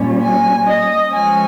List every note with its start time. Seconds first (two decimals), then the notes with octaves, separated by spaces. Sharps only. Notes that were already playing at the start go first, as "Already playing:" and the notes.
Already playing: A#2 G3 C#4
0.23 G#5
0.67 D#5
1.12 F3 G#3 C#4 G#5